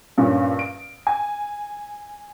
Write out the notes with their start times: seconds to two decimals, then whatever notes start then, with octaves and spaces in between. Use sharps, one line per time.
0.18 G2 A#2 C#4
0.59 D7
1.07 G#5